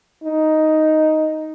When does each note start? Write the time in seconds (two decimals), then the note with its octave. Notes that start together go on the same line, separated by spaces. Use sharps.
0.24 D#4